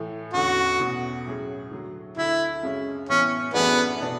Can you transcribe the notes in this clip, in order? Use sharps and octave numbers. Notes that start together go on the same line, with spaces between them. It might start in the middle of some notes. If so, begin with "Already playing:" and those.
Already playing: A2 E3 A3
E2 D3 A3 C#4 F#4
E2 B2 A3 C#4
A2 F#3 C#4 G#4
D3 F#3 A3
D2 D3 A3 E4
F#2 C#3 G#3 C#4
A2 E3 B3 C#4
F#2 E3 A3 B3 D4 G#4
B2 A3 D4 A4